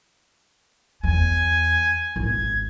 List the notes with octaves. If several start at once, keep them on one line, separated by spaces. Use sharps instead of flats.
E2 G#5
G#1 C#2 G#6